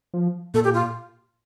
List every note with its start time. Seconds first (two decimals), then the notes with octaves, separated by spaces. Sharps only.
0.14 F3
0.54 A#2 A4
0.64 G4
0.74 F4